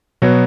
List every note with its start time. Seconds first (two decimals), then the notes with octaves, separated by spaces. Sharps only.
0.22 B2 F#3 B3